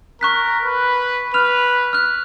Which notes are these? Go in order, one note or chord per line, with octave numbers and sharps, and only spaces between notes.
A#4 C#6 F#6 B6
B4
B4 F6 F7
F6 F#6